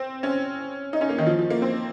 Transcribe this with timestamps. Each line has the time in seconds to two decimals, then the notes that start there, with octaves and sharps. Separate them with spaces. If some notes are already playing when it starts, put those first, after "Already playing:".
Already playing: C4
0.23 C#4
0.93 D#4
1.01 C#4
1.10 A#3
1.18 D#3
1.27 F3
1.39 F3
1.50 A#3
1.62 C4